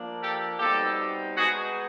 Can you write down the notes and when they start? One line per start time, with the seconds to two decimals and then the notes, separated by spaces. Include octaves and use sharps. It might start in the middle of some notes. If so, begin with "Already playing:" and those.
Already playing: F3 A#3 D4
0.20 G4 A4
0.58 B2 G3 C4 D#4 G4 A4
1.36 B2 G#3 B3 D#4 F#4 G#4